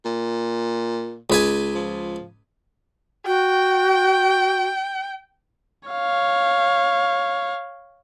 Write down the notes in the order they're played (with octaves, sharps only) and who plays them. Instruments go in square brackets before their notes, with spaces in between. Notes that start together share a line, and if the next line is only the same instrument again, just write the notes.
[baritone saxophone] A#2
[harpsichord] C#2 B4 G#5
[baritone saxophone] F3
[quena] F#4 [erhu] G5
[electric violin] C#5 F5